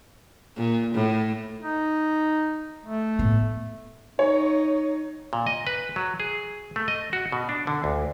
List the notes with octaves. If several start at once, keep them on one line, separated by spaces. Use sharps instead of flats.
A#2
A2
D#4
A3
A2 B3
D#4 C#5
A#2
D#5
B4
F#3
G#4
A3
D#5
F#4
B2
D4
D3
D2